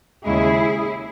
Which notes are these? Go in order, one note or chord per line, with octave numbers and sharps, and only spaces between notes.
D#2 C#3 G#3 E4 G#4